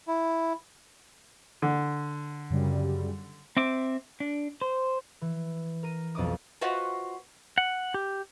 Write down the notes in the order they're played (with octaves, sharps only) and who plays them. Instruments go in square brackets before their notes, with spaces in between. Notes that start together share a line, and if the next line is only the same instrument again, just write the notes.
[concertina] E4
[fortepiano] D3
[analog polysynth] F#2 C#3 G3
[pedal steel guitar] C4 E5 D6
D4
C5
[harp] E3
A#4 D#7
B1 F2 D#5 D6 D#6
[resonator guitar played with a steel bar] F4 F#4 B4 C5 D#5 F#5
[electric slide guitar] F#5
G4